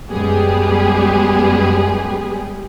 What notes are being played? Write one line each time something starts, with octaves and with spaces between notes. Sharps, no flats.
F#2 G3 G#3 B3 G4 G#4